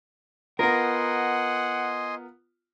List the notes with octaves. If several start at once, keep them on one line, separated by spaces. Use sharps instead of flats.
B3 F4 A#4 D#5 F#5 G#5 C6